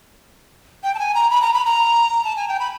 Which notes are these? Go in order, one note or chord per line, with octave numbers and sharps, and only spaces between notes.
G5
A5
G#5
A#5
B5
A#5
B5
A#5
A5
G#5
G5
B5